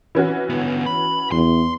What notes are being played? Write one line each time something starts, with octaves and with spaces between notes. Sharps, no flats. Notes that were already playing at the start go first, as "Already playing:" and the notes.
E3 C#4 F#4
D3 B3
B5
E2 C6